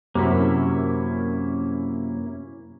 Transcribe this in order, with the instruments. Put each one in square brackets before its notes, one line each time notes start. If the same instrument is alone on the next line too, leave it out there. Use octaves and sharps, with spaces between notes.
[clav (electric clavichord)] F#2 C3 [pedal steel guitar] A#3 C#4 E4